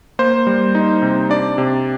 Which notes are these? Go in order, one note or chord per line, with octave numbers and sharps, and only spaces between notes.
A#3 C5
G3
D#4
C3
D4 D5
C3